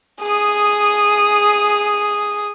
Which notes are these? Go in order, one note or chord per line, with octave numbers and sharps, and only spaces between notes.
G#4 D#6